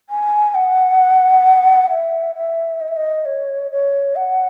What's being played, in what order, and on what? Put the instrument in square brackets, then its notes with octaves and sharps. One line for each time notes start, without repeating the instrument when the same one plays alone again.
[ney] G#5
F#5
E5
E5
D#5
E5
D#5
C#5
C#5
F#5